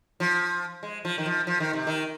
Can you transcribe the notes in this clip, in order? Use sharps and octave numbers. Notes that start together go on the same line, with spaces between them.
F3
G#3
F3
D#3
F3
F3
D#3
C3
D#3